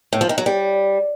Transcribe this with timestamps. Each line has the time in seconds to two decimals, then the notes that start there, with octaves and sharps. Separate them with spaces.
0.13 A2
0.21 F3
0.29 D#3
0.38 F#3
0.46 G3